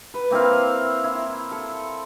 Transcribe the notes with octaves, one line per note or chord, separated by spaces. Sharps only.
B4
A#3 C4 E4 F5
E4
A4